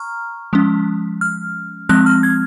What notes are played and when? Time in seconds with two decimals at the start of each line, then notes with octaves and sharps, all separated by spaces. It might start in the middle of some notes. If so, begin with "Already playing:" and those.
Already playing: A#5 C#6 F6
0.53 F3 G#3 C#4
1.21 F6
1.89 F3 G#3 C4 F#6
2.06 F6
2.23 G#6